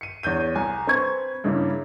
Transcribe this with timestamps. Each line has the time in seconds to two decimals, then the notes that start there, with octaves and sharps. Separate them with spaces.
0.01 C#7 D#7
0.23 E2 C#5 G6 D#7
0.55 C2 G#5
0.87 C4 B4 C#6 G#6
1.44 G2 C#3 G3 A#3 E4